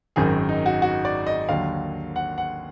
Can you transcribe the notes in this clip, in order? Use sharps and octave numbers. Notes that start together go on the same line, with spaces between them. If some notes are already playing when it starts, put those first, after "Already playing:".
G#1 F#2 D#3 F#3 G#4
D#4
F#4
F#4
D5
D#5
D#2 D3 F#3 F5
F#5
F#5